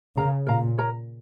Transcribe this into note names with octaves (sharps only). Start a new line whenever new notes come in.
C#3 A#4 F5 A#5
A#2 A#4 F5 A#5
A#4 C#5 A#5